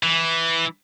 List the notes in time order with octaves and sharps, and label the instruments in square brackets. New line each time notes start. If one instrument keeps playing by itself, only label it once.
[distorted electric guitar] E3